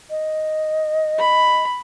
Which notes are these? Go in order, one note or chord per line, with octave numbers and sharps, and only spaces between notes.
D#5
B5